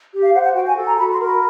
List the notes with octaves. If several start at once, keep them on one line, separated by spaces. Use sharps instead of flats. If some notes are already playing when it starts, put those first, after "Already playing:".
G4
F5
C5 F#5
F#5
F#4 G5
G#5
A4
A#5
F#4 B5
C6
A#4
B5